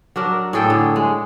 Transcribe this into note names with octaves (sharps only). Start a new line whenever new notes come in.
F#3 D4 A#4
A2 G#4 A4 G5
D3
G#3